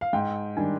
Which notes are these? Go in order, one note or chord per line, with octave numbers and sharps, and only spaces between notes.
F5
G#2 G5
D#3 G3 D4 G#5